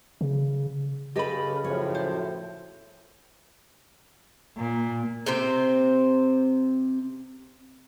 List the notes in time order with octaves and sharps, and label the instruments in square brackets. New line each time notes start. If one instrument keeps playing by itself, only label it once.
[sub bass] C#3
[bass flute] C#3 [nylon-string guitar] G4 A4 B4 [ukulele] D#5 B5
[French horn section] F#2 A2 F3 [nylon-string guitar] C#5
[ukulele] C5
[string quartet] A#2
[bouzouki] C3 C4 C5